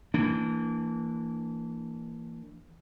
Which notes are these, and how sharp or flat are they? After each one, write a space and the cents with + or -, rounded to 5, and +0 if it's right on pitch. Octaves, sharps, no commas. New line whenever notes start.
E3 +0 A#3 -25 D4 +0